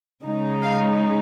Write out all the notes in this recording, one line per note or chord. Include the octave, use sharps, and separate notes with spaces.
C#3 G#3 D#4
F5